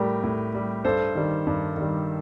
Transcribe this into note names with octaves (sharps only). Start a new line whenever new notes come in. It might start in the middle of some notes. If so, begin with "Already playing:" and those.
Already playing: A2 G3 G4 A#4
A2
G3
G2 A4 C5
D#3 G3
G2
D#3 G3